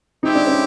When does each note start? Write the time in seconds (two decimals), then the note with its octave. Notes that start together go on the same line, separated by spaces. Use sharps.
0.23 G#3 C4 D#4 E4 G4
0.35 D4
0.47 C#4